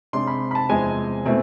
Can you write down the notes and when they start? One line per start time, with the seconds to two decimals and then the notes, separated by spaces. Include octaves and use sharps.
0.13 C3 G#3 D4 C6
0.27 B5
0.51 B5
0.55 A5
0.69 E2 C3 F3 G#3 C4 G#5
1.26 B2 A3 C4 E4